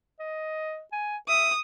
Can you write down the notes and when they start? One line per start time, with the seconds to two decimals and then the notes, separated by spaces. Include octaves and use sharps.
0.19 D#5
0.92 G#5
1.28 E5 D#6